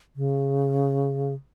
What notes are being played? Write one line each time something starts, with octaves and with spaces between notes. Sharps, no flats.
C#3